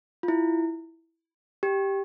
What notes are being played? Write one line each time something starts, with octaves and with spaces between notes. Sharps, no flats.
F4
E4
G4